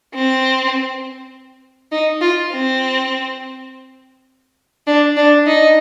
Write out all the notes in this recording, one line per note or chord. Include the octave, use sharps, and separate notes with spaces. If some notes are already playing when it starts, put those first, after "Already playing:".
C4
D#4
F4
C4
D4
D4
D#4